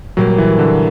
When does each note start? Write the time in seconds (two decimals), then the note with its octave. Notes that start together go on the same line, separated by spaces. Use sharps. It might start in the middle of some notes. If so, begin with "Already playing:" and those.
0.17 A#2 F#3 G3 A#3
0.38 E3
0.59 D3